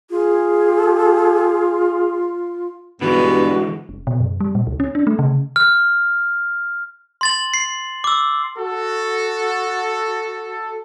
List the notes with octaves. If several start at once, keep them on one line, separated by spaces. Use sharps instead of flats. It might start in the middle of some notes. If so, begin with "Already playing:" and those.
F4 G#4
G2 D3 E3 G#3 B3 F#4
F1
B2
F#2
G3
A#2
C#2
C#4
D4
A3
C#3
F6
C6 A6 F#7
C7
D6 E6
F#4 A4